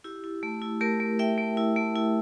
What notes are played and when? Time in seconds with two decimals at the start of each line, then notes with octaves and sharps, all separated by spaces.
0.04 E4 G4
0.24 E4
0.43 A3
0.62 E4
0.81 A3 G4 A#4
1.00 A3
1.19 A3 E5 G5
1.38 A3
1.57 E4
1.76 A3
1.96 E4